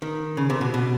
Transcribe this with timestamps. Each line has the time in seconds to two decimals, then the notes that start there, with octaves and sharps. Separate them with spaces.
0.02 D#3
0.37 C#3
0.50 C3
0.61 B2
0.74 B2